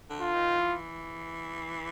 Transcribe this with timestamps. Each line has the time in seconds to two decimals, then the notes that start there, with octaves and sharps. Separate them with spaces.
0.10 D3
0.21 F4
0.34 D#3
0.58 E3